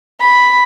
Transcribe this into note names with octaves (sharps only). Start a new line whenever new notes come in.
B5